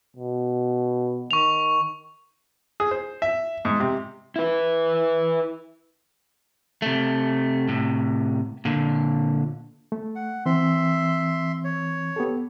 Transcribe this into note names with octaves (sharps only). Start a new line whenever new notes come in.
B2
D#3 C#6 F7
G#4
C5
E5
G#2
C3
E4 B4
C3 A3
A2 C3
A#2 D3
A3
F#5
E3 C4 E5 C6
C#5
B3 G4 A4